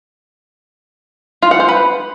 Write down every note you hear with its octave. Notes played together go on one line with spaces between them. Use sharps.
F4
F#5
C5
B4